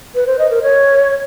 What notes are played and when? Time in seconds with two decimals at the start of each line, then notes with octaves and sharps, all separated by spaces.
0.15 B4
0.27 C5
0.39 D#5
0.51 A#4
0.63 C#5